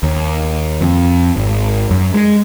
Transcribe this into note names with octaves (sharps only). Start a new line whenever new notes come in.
D#2
F2
G#1
F#2
G#3